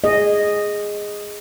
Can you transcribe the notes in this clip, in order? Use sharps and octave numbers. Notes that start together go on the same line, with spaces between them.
G#4 D#5